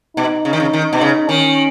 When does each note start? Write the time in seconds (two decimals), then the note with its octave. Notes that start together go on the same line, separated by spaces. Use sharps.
0.17 B2 D#4
0.45 C#3
0.53 D#3
0.60 C#3
0.73 D#3
0.93 B2
1.01 C#3
1.28 D#3 C#4